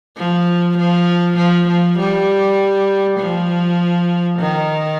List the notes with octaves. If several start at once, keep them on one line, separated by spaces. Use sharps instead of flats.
F3
F3
F3
F3
G3
F3
D#3